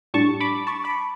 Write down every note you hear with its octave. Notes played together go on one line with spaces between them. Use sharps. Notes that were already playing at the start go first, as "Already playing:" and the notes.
A2 G3 D4 A5 C#6
B5 D6
A5 C#6
B5 D6